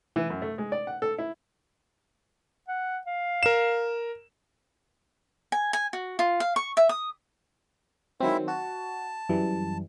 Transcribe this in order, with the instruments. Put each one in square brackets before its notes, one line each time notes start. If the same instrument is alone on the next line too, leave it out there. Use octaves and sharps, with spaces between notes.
[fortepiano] E3
F#2
A3
G#3
D5
F#5
A4
E4
[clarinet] F#5
F5
[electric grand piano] A#4 E7
[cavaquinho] G#5
G#5
F#4
F4
F5
C#6
E5
D#6
[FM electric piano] D#3 F#3 C4 [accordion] G#3 E4 E5
[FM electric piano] F#4 [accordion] A5
[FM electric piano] F#2 E3 G3